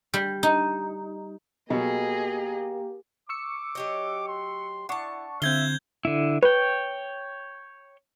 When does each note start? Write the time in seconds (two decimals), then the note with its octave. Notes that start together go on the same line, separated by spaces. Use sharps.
0.14 G3
0.43 D#4
1.70 B2 F#3 A#3 G4 G#4 D#5
3.29 C#6 D6 E6 C#7
3.75 F#3 G4 D#5
4.28 C6
4.89 D4 E4 F#5 A5 C#6
5.42 D3 C4 F4 E5 G6 G#6 G7
6.05 D3 E4
6.43 B4 C#5 G5